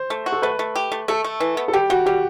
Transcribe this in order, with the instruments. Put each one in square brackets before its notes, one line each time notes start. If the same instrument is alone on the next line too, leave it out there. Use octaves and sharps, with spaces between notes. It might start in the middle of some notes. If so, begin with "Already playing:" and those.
Already playing: [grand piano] C5
[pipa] A3
F#4
[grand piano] A4
[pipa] A3 [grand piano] B4
[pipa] A3
G4
A3
[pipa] A3 [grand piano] A4
[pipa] A3
E3
B3
[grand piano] A4
[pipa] G3 [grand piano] G4
[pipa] G3 [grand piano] F#4
[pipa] G3 [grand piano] G4